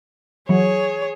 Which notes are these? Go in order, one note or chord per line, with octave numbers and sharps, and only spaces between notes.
E3 F#3 G#4 C#5